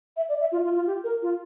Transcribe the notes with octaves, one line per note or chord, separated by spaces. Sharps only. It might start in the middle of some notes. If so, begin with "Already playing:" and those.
E5
D5
E5
F4
F4
F4
G4
A#4
F4